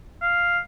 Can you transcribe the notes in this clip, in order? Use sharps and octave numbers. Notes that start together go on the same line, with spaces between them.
F5